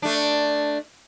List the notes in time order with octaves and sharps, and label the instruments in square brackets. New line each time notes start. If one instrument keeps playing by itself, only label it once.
[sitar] A3 D4